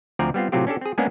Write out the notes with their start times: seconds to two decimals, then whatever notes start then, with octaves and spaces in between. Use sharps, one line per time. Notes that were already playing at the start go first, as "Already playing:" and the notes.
0.19 D2 F3 C4 D5 G#5 A#5
0.34 G3 B3 C4 F4
0.52 A2 C3 F#3 C4 F4 G4
0.67 C#4 D4 G4 A4
0.81 C4 G#4
0.98 G#3 A#3 B3 C#4 D4 G#4